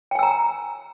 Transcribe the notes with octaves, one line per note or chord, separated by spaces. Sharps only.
G5 G#5 A#5 E6